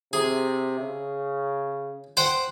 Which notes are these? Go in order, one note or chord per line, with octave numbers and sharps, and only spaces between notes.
C3 G#4
C#3
C5 F#5 G5